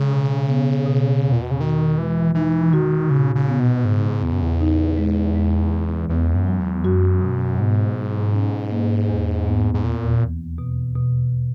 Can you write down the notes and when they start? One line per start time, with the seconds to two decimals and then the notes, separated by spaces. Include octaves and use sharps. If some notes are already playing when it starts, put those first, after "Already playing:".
Already playing: C#3 G#3
0.11 B2
0.49 B3
0.86 B2
1.23 E2
1.32 A#2
1.42 B2
1.51 C#3
1.60 D#3 F#4
1.98 E3 G#3
2.35 E3 D#4
2.73 D#3 F#4
3.10 A#2 C#3
3.36 C#3
3.48 B3
3.60 B2
3.85 G#2 C#3
4.22 E2 B3
4.32 F#2
4.42 E2
4.60 D#4
4.97 G#3
5.35 G#3
5.73 E3
6.09 E2 B3
6.35 F#2
6.47 F#3
6.60 E2
6.84 F#2 F#4
7.21 B2
7.60 G#2 B3
7.96 F#3
8.34 C#4
8.71 A#3
9.09 E2
9.47 B3
9.74 G#2
9.84 D#2 A#2
10.21 E3
10.58 B2
10.95 B2